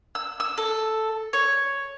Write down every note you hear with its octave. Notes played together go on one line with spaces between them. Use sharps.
E6
E6
A4
C#5